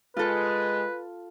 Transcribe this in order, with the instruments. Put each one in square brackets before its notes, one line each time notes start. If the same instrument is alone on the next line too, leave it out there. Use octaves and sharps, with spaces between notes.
[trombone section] G#3 [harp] F4 A4 [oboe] B4